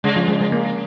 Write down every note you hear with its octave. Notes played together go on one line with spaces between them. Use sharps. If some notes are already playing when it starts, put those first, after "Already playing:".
C#3 G#3
F3
G#3
G#3
A#3